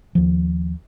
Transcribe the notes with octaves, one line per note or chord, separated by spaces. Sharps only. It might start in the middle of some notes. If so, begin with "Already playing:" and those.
D#2 F3